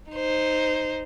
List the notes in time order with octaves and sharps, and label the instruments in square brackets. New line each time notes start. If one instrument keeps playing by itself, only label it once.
[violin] D#4 C5